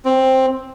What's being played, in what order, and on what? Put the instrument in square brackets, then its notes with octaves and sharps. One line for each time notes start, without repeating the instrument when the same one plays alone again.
[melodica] C4